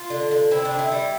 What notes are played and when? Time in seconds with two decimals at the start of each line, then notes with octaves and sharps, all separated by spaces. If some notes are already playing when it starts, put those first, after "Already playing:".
Already playing: F4
0.10 D3
0.31 D3
0.51 C4 E4
0.65 D4
0.71 D3
0.79 E4
0.92 G3